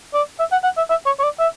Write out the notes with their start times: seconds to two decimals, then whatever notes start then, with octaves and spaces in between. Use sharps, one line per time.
0.14 D5
0.39 E5
0.52 F#5
0.64 F#5
0.77 E5
0.90 E5
1.06 C#5
1.19 C#5
1.24 D5
1.40 E5